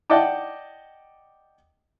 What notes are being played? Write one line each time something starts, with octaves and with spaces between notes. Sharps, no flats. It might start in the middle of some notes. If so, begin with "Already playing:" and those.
D5 D#5 F#5 G5 A5 D6